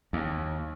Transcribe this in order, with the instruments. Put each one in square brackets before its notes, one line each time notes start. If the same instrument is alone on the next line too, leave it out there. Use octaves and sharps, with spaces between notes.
[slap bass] D#2